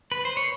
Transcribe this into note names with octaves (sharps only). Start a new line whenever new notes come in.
B4
C5
C#5